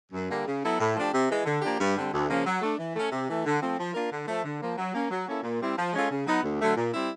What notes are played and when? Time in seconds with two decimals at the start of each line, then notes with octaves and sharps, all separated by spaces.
0.12 F#2
0.30 D3 G3 A#3
0.46 C#3
0.63 F#3 B3 E4 A4
0.79 A2
0.95 F3 A3 D4 G4
1.13 C3
1.30 E3 G#3
1.45 D3
1.61 F3 A#3 D4 G4
1.79 G2
1.96 D3 G3 C4
2.12 D2
2.28 C#3 F3 A#3 C#4
2.46 F#3
2.61 A3 D4
2.78 E3
2.95 A3 C#4
3.11 C3
3.28 E3 A3
3.45 D3
3.61 F3 A3 C4
3.78 F3
3.94 A#3 D4 F4 A#4
4.10 D3
4.27 F3 A3
4.44 D3
4.60 F3 A#3
4.77 F#3
4.93 A#3 C#4
5.10 F#3
5.27 A#3 C#4 E4 A4
5.43 A#2
5.60 G3 C4 E4
5.77 F3
5.93 G#3 C#4 F4 A4
6.10 C#3
6.26 F#3 B3 D#4
6.43 D2
6.60 D3 F#3 A3
6.76 A#2
6.93 G3 C4 E4